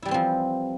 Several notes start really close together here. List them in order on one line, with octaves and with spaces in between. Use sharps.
E4 G3 E3 C4 F3